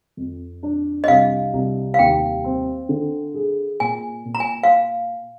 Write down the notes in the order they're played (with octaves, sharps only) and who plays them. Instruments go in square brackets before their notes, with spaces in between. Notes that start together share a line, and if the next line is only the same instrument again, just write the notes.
[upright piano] F2
D4
[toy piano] D#5
[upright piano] C2 [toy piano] F5
[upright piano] C2
[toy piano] F5
[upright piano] D#2 [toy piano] G5
[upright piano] C4
D3
G#4
[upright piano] A#2 [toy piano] G#5
[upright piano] A#2
[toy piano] A#5
G#5
F5